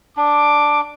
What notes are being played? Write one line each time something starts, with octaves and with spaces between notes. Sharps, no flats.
D4 D6